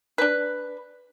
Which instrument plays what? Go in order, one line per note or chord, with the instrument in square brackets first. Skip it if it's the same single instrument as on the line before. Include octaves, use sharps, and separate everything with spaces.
[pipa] D4 B4